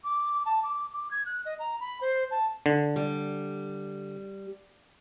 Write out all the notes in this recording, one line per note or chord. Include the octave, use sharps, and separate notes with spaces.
D6
A5
D6
D6
G#6
F#6
D#5
A#5
B5
C5
A5
D3
G3